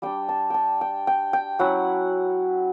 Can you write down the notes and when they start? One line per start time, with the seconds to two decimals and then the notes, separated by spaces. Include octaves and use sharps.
0.02 G3 D4 G5
0.29 A5
0.50 G5 A5
0.81 G5
1.07 G5
1.33 G5
1.59 F#3 C#4 E4 F#5